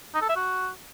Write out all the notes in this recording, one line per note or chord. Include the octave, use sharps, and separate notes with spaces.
D#4
A4
E5
F#4